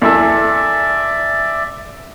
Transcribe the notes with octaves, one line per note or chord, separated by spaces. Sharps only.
E2 E4 A4 D5 E5